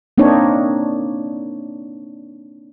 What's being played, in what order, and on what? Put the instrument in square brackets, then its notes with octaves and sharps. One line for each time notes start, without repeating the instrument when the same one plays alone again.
[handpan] A#3 C4 D4 D#4 C#5